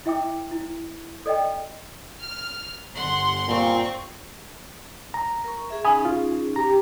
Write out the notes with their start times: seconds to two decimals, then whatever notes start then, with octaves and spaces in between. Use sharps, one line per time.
0.06 E4 E5 G5 D6
0.51 E4
1.26 A4 D5 D#5 G5
2.20 F6
2.95 G1 F#5 C6
3.48 A#2 C4 C#6
5.14 A#5
5.44 A#4 C#6
5.70 G#4 E5
5.85 C#4 D#4 G#4 G#5 B5 D#6
6.05 F4
6.56 G4 A#5